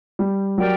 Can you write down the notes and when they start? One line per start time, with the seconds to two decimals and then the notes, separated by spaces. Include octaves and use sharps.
0.19 G3
0.58 F#3 G4 A#4 D5 G5